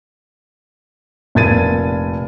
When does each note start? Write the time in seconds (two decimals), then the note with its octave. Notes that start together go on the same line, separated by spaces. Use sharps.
1.35 F1 A#2 G#6 A6 D#7